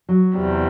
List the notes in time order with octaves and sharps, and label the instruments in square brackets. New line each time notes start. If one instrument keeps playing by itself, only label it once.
[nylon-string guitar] F#3
[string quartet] E2 C3 G3